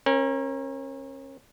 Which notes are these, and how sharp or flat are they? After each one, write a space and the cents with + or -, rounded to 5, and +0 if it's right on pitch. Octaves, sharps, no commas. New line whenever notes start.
C#4 -35 A#4 +15